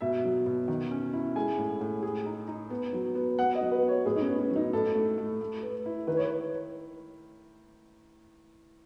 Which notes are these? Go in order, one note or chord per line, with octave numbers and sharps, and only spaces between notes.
B2 E5
F#3
B2
D#3
C#4
E4
G#3 G#5
A2
A2
G#4
D#4
D#4
B3
F#3
B3
B3 F#5
D#5
F#3
B4
B3
C#5
A2 G#4
D#4
C#4
B3
C#4
F#3
D#4
A2 A4
A3
A3
A3
B4
E4
D#3 B4
C#5
B4